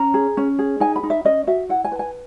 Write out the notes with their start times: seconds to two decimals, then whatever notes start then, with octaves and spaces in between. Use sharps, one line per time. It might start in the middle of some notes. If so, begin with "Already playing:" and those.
Already playing: C#4 A#5
0.14 G#4
0.37 C#4
0.59 G#4
0.80 D#4 G#5
0.96 B5
1.03 D#4
1.10 E5
1.25 C#4 D#5
1.47 F#4 E5
1.69 E4 F#5
1.85 G#5
1.92 B4
1.99 G#5